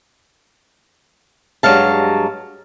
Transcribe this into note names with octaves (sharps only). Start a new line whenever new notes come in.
G2 F#3 G#3 F5 A5